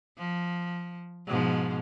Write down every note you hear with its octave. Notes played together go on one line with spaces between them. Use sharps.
F3
G#2 B2 F3